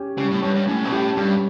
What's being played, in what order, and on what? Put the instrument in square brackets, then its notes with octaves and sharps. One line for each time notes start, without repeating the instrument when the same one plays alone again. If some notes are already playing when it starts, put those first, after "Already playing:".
Already playing: [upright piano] C#4 G4
[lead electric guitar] C#3 [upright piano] G3
[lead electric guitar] A2
[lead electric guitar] G2 [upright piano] C#5
[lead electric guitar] G2
[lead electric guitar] A2 [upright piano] C#4
[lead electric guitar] B2
[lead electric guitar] A2 [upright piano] G4
[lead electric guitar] G2 [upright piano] G3